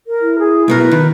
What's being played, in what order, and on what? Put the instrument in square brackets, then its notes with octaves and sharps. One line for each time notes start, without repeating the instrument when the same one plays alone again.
[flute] A#4
[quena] E4
[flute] G#4
[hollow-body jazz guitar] B1 B2 A#4 [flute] B4
[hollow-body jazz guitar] D#3